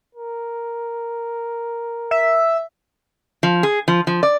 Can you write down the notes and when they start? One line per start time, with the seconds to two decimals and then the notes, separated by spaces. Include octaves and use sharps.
0.15 A#4
2.11 E5
3.43 F3
3.63 G#4
3.88 F3
4.07 F3
4.23 D5